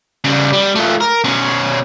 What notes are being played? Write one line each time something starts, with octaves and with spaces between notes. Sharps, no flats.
C#3 G3
G3
A3 F4
A#4
B2 C#4